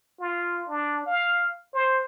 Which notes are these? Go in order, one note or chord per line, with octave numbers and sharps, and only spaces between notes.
F4
D4
F5
C5